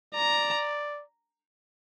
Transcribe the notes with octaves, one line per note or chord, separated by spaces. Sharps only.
D5 A#5